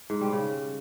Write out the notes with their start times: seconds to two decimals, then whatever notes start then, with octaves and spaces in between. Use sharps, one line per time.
0.10 G#2
0.21 G3
0.33 C#3